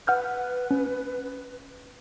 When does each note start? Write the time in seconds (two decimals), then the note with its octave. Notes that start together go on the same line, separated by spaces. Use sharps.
0.07 B4 F#5 F6 G6
0.71 C#4